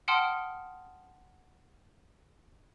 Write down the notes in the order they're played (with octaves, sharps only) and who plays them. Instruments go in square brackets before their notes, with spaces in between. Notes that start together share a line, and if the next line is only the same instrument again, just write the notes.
[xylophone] F#5 G5 A5 C6 D#6 F6